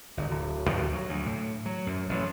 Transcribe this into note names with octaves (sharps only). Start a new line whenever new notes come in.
G1
D1
D2
F#3
D2
A2
F#3
F#2
A1